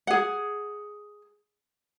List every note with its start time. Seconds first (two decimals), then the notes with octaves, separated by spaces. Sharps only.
0.07 G#4 F#5